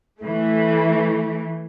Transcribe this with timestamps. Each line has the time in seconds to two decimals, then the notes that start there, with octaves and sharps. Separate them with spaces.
0.21 E3 A3